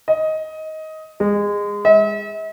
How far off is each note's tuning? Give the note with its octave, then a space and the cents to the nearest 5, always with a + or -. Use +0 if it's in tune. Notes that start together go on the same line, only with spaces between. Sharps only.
D#5 +15
G#3 -25
E5 -45